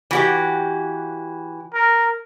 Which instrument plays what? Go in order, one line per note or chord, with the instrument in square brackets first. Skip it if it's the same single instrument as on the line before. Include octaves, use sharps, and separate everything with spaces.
[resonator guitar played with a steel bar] E3 F#4 G4
[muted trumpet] A#4